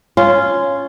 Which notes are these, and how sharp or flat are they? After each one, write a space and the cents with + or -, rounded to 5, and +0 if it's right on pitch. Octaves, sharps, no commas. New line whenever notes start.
C#4 +0 F4 -10